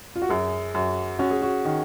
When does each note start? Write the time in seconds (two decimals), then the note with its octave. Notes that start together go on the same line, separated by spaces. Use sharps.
0.16 F4
0.22 F#4
0.29 F#2 G#4
0.74 F#2 F#4
1.19 C#4 F#4
1.31 G#4
1.42 F#4
1.65 D#3